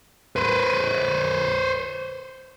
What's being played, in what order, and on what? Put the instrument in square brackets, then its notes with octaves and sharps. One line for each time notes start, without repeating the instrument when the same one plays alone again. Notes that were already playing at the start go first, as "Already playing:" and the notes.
[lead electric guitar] B4 C5